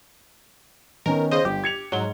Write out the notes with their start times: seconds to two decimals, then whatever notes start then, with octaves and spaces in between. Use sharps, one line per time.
1.06 D#3 B3 C#4 A#4
1.31 C#3 C5 D#5
1.45 G1 G4
1.64 G#6 C#7 F7
1.92 G#2 F#3 G7